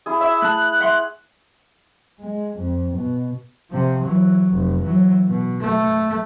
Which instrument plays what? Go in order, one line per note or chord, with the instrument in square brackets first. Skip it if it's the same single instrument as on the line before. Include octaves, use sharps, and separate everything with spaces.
[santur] E4 G#4
[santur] C#5 [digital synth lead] E5
[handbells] A3 A5 [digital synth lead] F#6
[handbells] E5 F#5 C6
[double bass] G#3
F2
B2
C3 F3
E3 F#3
F1
E3 F#3
B2
A3